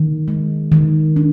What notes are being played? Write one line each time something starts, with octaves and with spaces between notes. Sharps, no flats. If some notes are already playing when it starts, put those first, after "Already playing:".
Already playing: D#3
G#3
D#3
D4